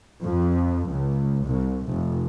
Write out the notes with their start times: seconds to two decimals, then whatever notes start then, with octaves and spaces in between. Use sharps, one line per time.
0.23 F2
0.89 C#2
1.46 C2
1.88 F1